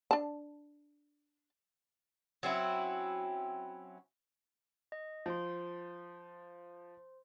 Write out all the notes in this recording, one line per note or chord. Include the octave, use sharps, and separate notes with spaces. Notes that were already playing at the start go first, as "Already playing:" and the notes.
D4 A5
F#3 C4 C#4 E4
D#5
F3 C5 C6